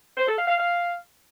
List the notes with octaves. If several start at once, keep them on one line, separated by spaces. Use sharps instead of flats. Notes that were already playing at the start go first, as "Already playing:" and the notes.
C5
A4
F5
F5
F5